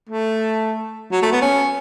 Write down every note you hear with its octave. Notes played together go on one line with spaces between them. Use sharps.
A3
F#3
A3
B3
C#4